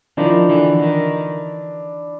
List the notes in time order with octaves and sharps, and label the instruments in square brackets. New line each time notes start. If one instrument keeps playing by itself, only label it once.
[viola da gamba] D#3 F3 [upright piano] D4 E4
[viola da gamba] D3 E3
D#3